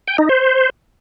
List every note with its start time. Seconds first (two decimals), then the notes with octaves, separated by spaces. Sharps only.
0.08 G5
0.18 D#4
0.29 C5